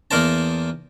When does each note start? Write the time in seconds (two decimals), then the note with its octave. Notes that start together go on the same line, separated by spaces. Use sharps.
0.11 E2 A#3 A#4 C5 A5